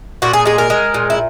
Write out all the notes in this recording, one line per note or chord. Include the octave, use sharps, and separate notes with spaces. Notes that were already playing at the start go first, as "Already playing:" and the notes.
A#2 F#4
G#4
G#3 G#4
A#4
G#3
A#2
E4